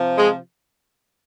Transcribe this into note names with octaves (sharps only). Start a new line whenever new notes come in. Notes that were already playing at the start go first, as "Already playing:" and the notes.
Already playing: C3 F3
G#3